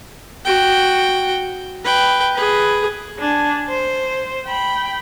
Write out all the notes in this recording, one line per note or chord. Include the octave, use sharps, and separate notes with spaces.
F#4 G5
B4 G5
G#4 B4
D4 G#5
C5
G5 B5